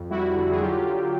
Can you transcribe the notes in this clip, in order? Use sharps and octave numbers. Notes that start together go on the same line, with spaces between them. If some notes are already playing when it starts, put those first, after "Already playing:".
Already playing: F2
G3 E4 F#4
D3
G#4
F#3 F4 G4
D3